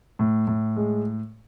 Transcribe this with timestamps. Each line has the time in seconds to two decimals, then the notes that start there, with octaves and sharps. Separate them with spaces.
0.19 A2
0.47 A2
0.77 G#3